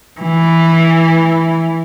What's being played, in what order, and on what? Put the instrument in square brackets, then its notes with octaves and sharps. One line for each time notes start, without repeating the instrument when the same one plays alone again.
[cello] E3